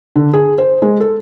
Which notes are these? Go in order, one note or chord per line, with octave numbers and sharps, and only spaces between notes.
D3
G#4
C5
G#3
A4